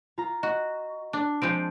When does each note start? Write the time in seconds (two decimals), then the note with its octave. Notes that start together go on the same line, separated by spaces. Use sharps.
0.18 F4 A#5
0.43 F#4 D#5
1.13 D4
1.42 F3 G#3 C4 G6 D7